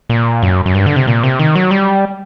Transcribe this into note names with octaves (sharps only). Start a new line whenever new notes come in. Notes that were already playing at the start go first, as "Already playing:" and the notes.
A#2
F#2
F#2
G2
D3
C3
A#2
C3
D#3
F#3
G3